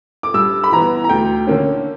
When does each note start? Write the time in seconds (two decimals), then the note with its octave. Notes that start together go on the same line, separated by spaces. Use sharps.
0.23 D6
0.34 G2 E6
0.64 B5
0.72 E3 B3 A#5
1.04 A#5
1.09 D2 G5
1.47 D3 A#3 C#4